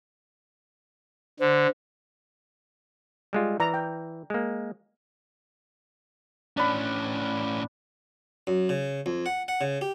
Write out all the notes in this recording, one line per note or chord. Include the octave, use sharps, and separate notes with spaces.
D3 C5
G3 G#3 F4
E3 D5 A#5
G5
G#3 A#3
A2 C#4 D4 B5
F#2
C#3
F2
F#5
F#5
C#3
G4